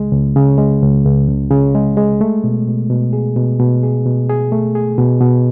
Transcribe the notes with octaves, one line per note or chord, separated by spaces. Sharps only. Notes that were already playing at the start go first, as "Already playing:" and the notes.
Already playing: C#2 C#3 G#3
C#2
C#3
G#3
C#2
C#2
C#2
C#3
G#3
G#3
A3
B2
B2
B2
G#4
B2
B2
G#4
B2
G#4
A3
G#4
B2
B2